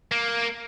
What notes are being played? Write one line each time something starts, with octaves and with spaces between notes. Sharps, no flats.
A#3